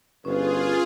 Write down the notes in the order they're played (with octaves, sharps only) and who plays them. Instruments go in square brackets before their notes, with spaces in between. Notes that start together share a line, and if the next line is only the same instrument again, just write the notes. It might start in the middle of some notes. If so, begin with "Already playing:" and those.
[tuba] G1 [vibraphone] C#4 [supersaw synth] F4 G#4 [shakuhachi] B4